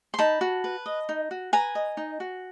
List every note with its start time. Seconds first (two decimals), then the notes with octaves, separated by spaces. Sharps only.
0.14 C6
0.19 D#4 A5 B5
0.41 F#4
0.64 B4
0.86 D#5
1.09 D#4
1.31 F#4
1.53 B4 G#5 A#5
1.75 D#5
1.97 D#4
2.20 F#4